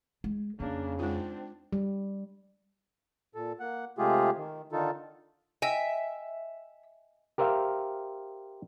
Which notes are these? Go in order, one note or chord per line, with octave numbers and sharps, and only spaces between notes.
G#3
F2 C#3 A#3 D4
G#3 C4 D4 D#4 F4
G3
A#2 A4
A#3 F#5
C3 G#3 A3 F4 G4 G#4
D#3
D3 D#3 D#4 F4 A4
D#5 E5 G5 G#5
G4 A#4 C5 E5 F5